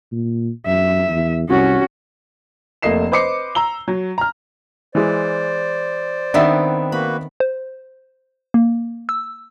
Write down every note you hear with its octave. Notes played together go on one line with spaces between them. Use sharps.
A#2
F#2 E5
E2
C2 C#4 F#4
F1 A3 A#3 D#5 C7 E7
B4 C5 D#5 D6 C7 C#7
A#5 E6 G7
F#3
A#5 F6
E3 G#3 C5 D5
D#3 B3 C4 D4 E5
A#3 F#4 B4 B5
C5
A#3
E6